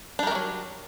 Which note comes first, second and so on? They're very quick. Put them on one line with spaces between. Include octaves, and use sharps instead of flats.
D4 G3 A#4 A3 F#3